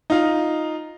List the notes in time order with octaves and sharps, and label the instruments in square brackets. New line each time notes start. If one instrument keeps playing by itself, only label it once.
[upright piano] D#4 F4